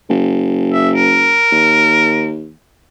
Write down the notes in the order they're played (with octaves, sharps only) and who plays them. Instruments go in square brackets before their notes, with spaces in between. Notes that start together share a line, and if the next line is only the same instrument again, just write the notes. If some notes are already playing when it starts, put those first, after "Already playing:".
[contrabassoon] F#1
[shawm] E5
A#4
[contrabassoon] D#2